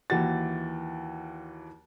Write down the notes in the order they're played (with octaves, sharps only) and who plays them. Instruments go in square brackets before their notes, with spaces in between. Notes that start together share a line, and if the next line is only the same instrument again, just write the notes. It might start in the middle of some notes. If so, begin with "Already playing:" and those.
[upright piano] D#2 E3 F#4 A6